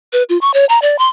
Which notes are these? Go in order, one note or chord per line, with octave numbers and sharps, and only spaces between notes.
B4
F4
C#6
C#5
A#5
D5
C6